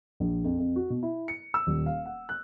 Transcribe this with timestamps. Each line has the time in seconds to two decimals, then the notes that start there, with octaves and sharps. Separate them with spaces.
0.20 A#1
0.44 F2
0.59 F2
0.76 F#4
0.90 B2
1.03 E4
1.28 C#7
1.54 E6
1.67 D#1
1.86 F5
2.05 F#5
2.29 F#6